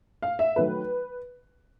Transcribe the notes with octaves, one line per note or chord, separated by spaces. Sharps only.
F5
E5
D#3 F#3 A3 B4